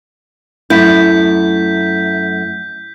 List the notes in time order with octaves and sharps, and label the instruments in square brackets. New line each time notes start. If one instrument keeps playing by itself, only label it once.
[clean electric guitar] F#2 A3 [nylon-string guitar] E4 [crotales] G6 B6